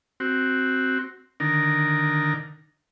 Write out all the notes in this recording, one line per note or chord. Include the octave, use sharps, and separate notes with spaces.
C4 F#4
D3 D#3 A#4